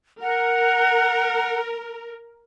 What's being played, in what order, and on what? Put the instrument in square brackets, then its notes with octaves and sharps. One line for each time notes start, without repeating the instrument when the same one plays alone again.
[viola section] A#4 [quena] F#5